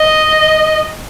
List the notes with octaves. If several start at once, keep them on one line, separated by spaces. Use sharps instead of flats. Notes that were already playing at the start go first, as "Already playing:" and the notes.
Already playing: D#5